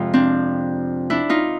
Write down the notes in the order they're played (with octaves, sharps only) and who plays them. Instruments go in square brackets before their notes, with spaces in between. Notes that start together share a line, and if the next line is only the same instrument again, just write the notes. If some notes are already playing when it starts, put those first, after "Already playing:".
Already playing: [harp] F2 C3 F3 G#3 F4
C4 D4
D4 E4
D#4 F4